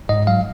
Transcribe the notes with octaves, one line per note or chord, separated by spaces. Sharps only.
G#2 D#5
F#3 F5